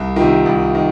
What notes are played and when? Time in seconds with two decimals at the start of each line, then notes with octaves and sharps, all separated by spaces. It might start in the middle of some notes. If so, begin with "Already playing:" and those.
Already playing: C2
0.16 C3 D#3 F4
0.46 C2
0.75 D#3